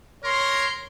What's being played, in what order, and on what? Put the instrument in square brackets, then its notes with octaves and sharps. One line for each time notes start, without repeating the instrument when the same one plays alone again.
[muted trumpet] A#4 [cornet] C#5 [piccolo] C6